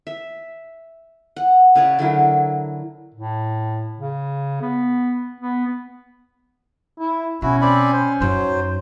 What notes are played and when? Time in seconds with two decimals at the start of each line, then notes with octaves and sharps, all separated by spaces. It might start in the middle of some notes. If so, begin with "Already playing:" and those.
0.07 E5
1.36 F#5
1.75 C#3 B4 C#5 D5
1.99 D3 F#3 E4 A#4
3.15 A2
3.98 C#3
4.61 B3
5.41 B3
6.99 E4
7.42 B2 C#4 E4 F#4
7.61 C4 D5 B5
7.93 C5
8.21 F#2 F#3 D#4 C5